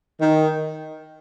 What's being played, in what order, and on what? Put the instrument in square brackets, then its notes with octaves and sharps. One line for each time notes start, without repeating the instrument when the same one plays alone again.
[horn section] D#3